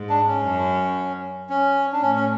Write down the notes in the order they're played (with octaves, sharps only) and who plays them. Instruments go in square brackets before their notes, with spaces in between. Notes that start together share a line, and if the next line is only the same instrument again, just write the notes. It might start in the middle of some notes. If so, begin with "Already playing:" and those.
Already playing: [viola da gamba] G#2
[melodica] D4
C#4
[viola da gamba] F#2
[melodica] C#4
D4
[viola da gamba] A2 [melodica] C#4
[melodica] C#4